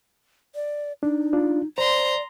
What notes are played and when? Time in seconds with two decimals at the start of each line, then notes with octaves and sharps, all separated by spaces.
0.55 D5
1.03 D4 D#4
1.33 D4 F4
1.78 C5 D5 A#5 C6